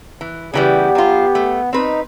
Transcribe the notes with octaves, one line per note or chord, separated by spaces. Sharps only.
E3
C#3 E3 G3 B3 G4
F#3 F4
A3
C4 D#4 B4